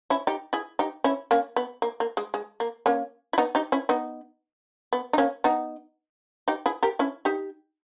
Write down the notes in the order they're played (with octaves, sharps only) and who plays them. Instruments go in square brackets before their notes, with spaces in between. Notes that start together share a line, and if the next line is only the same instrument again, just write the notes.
[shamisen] C#4 E4
D#4 G4
E4 G#4
D#4 G4
C#4 E4
A#3 C#4
B3
A#3
A#3
G#3
G#3
A#3
A#3 C#4
E4
B3 D#4
D#4 G4
C#4 E4
B3 D#4
B3
D#4
A#3 C#4
B3 D#4
D#4 G4
E4 G#4
G4 A#4
C#4 E4
D#4 G4